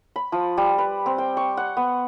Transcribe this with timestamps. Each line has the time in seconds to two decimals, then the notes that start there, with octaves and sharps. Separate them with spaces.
0.16 B5
0.32 F3
0.57 G3
0.78 B4
1.06 C4
1.18 G5
1.37 C#6
1.57 F#5
1.77 B3